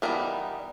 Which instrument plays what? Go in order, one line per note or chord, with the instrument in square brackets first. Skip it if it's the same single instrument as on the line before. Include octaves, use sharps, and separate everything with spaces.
[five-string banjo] E3 G3 B3 D#4 A#4